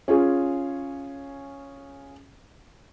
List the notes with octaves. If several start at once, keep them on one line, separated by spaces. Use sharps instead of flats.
C#4 F4 G#4